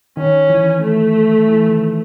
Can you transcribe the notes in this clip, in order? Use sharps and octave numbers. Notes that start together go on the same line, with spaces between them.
D#3 C#4
E3
A3
E3
D#3